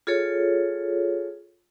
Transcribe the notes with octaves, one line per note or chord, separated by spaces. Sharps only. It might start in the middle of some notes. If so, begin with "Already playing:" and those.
F4 G#4 A4 C#5